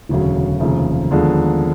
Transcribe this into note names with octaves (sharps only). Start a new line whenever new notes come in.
E1 D2 C#3 F#3
F1 D#2 C#3 F3
D#2 D3 F3 G#3 B3